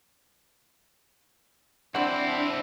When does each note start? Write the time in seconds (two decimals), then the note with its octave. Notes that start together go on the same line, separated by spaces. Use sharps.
1.95 C4 D4 E4 C5 D5 F#5